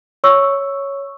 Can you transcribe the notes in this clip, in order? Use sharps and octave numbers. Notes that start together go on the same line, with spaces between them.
C#5 C#6 E6